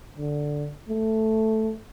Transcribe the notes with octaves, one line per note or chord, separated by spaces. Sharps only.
D3
A3